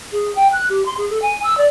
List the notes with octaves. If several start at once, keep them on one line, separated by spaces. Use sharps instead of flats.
G#4
G5
F#6
G4
C6
G#4
A4
G#5
E6
D5